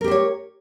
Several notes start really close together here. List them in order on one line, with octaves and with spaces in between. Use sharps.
A#4 G4 C5 C#5